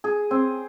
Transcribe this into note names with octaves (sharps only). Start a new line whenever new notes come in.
G#4
C4